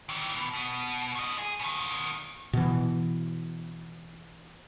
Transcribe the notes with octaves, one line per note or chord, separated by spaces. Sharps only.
D#3 E3
B2
B2
A2 D#5
G#4
B2 D#3
B2 E3